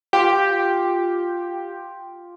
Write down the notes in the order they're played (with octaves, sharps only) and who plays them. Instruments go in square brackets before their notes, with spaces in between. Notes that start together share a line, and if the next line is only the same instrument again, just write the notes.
[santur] F4 [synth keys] G4